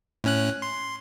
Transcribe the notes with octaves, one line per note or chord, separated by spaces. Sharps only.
A2 C#4 F#6
C6